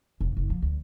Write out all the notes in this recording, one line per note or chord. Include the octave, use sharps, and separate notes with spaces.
F1
F#1
F3
D2